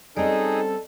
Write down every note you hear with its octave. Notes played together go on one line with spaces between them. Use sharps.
G3 C4 C#4 D#4 G#4 A4 D5 D#5